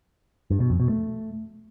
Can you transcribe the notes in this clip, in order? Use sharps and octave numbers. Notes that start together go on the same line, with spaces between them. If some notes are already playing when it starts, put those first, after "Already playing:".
G2
B2
F2
B2
A3